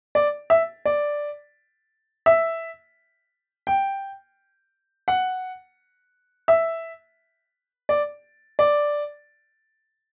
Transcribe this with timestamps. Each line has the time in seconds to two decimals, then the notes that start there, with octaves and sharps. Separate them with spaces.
0.15 D5
0.50 E5
0.85 D5
2.26 E5
3.67 G5
5.08 F#5
6.48 E5
7.89 D5
8.59 D5